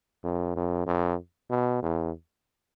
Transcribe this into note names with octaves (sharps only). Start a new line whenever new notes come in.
F2
F2
F2
B2
E2